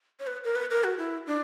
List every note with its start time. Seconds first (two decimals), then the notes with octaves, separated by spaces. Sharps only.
0.20 C#5
0.27 B4
0.44 A#4
0.56 B4
0.71 A#4
0.84 F#4
0.98 E4
1.27 D4